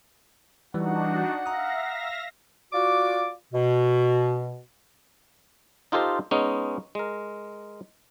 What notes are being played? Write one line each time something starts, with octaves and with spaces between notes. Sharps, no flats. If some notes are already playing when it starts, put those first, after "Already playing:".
E3 G3 D4 D#4 F#4 F#5
E5 F5 A#5 D#6 A#6
F4 F#4 D5 D6
B2
D#4 F4 G4 A4 C5 D#5
G#3 B3 C#4 D#4
G#3 A#4